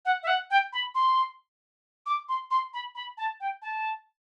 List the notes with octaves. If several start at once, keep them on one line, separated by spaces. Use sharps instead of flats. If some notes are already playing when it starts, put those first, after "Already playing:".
F#5
E5
F#5
G5
B5
C6
D6
C6
C6
B5
B5
A5
G5
A5